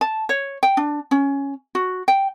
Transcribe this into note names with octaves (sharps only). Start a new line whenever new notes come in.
A5
C#5
G5
D4
C#4
F#4
G5